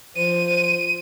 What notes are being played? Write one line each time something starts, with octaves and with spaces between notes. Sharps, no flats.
F3 C5 D#7